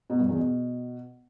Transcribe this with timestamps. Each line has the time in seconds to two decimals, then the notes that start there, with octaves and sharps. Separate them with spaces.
0.10 B2
0.19 G2
0.29 E2
0.39 B2